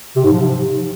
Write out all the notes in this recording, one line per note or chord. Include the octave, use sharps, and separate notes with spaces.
C3
G#2
F3
C3